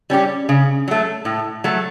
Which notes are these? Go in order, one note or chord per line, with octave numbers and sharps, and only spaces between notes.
G3 C#4 G4
C#3
F#3 A3
A2
F#3 A3